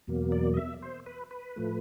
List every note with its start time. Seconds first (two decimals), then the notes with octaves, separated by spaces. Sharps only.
0.07 E2 B2 F#3 A#3
0.32 D5
0.54 D#5
0.57 E5
0.82 C5
1.06 B4
1.31 B4
1.56 A2 F3 A3